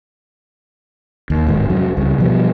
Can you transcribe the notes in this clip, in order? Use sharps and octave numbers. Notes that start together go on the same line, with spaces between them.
D#2
D1 G#2 D#3
F1 F#3
C#2 G3
B2 F3 G3